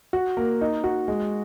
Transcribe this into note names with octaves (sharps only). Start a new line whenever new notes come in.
F#4
A#3
D#4
F#4
G#3